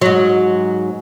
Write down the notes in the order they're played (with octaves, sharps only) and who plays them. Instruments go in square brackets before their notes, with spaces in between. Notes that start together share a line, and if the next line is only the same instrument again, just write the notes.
[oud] G#2 F#3